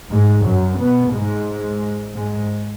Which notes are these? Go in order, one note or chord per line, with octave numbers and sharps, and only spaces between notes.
G#2 G#3
F#2 F#3
B2 B3
G#2 G#3
G#2 G#3